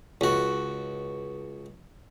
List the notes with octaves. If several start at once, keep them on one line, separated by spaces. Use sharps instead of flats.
C#2 F#4